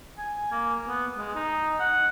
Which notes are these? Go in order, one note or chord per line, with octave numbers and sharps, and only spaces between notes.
G#5
A#3
B3
G#3
D#4
F#5